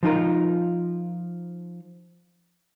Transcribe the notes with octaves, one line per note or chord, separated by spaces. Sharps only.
F3 D#4 F4 A#4